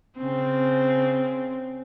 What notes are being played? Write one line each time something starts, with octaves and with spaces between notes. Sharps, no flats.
C#3 C4